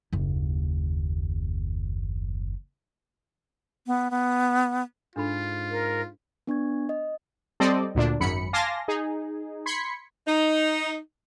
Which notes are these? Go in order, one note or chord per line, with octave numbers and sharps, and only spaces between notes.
F#1 D#2
B3
B3
G#2 D4 F4 A4 B5
A#4
B3 D4 C#6 G#6
D#5
G3 C4 A4 C5 D5 D#5
D2 A#2 D4
G#1 F#2 B5 C#7
F5 G#5 A5 C6 D6 A#6
D#4 G#4
B5 C6 G#6 B6 C#7
D#4